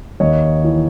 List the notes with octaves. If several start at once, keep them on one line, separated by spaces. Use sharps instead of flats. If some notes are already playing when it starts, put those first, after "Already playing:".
D#2 C#5 D#5
E3